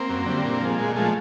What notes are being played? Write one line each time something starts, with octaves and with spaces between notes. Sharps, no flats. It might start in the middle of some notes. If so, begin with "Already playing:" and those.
Already playing: A#3 C4
F#2
D3 G3
A#2
F3 G#3
A#2 G#3
F3 G#3 A3